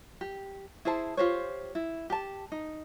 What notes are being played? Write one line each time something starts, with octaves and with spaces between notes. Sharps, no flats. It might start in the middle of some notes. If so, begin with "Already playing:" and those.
G4
E4 G#4 C5 A5
F4 G4 C5 C#5
E4
G4 A5
D#4